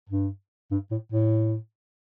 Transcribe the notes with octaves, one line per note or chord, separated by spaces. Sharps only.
G2
G2
A2
A2